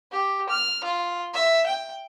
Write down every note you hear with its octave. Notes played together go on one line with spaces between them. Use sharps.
G4
F6
F4
E5
G5